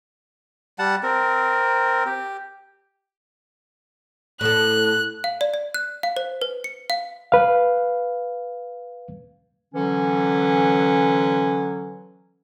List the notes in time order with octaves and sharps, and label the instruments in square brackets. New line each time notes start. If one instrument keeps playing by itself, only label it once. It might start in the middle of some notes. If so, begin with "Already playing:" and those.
[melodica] G3 F#5 A5
C4 A#4
G4
[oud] A2 A4 [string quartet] F#6
[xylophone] F5
D5
D5
F#6
F5
C5
B4
C#7
F5
[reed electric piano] B4 F5
[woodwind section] D3 E3 F#3 C#4